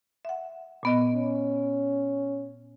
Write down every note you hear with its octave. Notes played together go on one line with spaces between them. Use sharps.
E5 F#5
A#2 B3 D#5
C#4